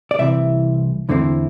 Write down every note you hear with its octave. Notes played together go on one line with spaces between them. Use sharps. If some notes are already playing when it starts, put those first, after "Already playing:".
D5
C2 C3 E3 E5
E2 D3 A3 C4 E4